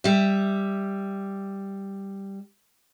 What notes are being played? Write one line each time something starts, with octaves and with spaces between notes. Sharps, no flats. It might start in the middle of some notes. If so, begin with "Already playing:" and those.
G3 E5